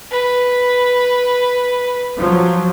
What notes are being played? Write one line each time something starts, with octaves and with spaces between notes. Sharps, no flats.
B4
F3 F#3